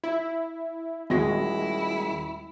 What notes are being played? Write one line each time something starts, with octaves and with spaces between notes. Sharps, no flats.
E4
D#1 G#3 E4 F#4 A#6